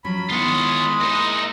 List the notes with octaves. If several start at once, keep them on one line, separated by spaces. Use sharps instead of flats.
F3 F#3 C#4 B5
D#3 G#3 B3 E4 F4 C#5
A#3 D#4 E4 G#4